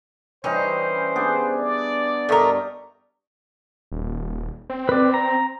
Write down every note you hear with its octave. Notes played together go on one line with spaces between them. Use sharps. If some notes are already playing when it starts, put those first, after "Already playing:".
E3 G3 C#4 D#4 C5
B3 D4 G#4
D5
G2 A3 A#4 D#5 C#6
D#1
C4
B4 D5
A#5